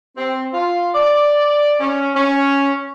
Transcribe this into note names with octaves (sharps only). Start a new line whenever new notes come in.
C4
F4
D5
C#4
C#4